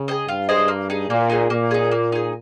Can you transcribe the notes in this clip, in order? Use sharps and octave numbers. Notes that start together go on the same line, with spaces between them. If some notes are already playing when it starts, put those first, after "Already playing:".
Already playing: C#3
G#4 C5 D#5
G2 F4
G#4 C5 D#5
A#3
D#4 G#4
A#2 A#3
D#4 G#4
A#2 A#3
D#4 G#4
A#3
D#4 G#4